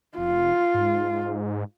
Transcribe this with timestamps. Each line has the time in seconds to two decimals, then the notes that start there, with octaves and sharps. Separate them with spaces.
0.17 F1 F4
0.74 G#2